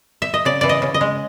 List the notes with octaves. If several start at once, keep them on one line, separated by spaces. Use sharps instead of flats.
E5
D#5
C#3 D5
E3 D5
D#5
C#3
D#5
G#3